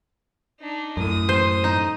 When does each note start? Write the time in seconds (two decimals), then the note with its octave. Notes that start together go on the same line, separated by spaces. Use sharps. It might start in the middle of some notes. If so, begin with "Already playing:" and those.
0.60 D4 D#4
0.97 F#2 A2 D#6
1.29 C5
1.64 D#4